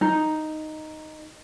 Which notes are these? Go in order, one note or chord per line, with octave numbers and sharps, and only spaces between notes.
D#4